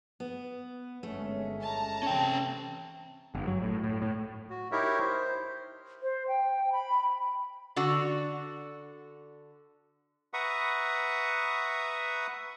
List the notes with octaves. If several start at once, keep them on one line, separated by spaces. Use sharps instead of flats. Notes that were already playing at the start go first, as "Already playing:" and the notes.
B3
G1 G#3 A3 C#4
A5 A#5
C3 E3 C4 C#4 G5
G1
F#3
A2
A2
A2
F#4
D#4 E4 G4 A#4 C#5 E5
C5
C5
G5
B5
D3 D4 F#4
B4 E5 F#5 A#5 C#6 D#6